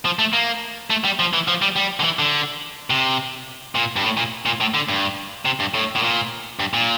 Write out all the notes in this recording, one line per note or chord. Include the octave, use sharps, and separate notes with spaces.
F3
A3
A#3
A3
G3
F3
E3
F3
G3
G3
D3
E3
D3
C3
A#2
G2
A2
A#2
A#2
A2
D3
G2
C3
G2
A2
A2
A#2
G2
A#2